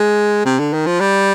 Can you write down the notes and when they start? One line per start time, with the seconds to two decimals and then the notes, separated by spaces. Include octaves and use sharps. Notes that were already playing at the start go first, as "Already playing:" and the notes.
Already playing: G#3
0.46 C3
0.60 D3
0.73 D#3
0.87 F3
1.00 G3